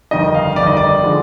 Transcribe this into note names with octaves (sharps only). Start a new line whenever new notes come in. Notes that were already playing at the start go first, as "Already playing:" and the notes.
G1 F2 D#3 G3 D#5
F5
G1 F2 D#3 G3 D5
D#5
D5
D3 F3 G#3